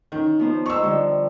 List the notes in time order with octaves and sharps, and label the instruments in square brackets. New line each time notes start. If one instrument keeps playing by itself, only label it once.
[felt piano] D#3 [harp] C#4
[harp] F3 B3 C5
[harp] D#4 C5 [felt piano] C#6 E6
[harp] D3 F3 G3